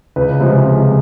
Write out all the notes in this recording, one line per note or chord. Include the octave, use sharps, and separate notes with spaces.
C#2 B4
C3 F3 G#3
C#2